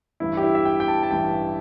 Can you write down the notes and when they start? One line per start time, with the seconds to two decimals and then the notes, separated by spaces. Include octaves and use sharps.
0.20 A1 G2 E3 E4
0.37 G4
0.43 E4
0.55 E5
0.65 G5
0.80 G5
0.88 A5
1.03 A5
1.11 A1 G2 E3 G5